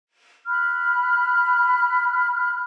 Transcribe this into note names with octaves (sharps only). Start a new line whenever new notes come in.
B5 F6 F#6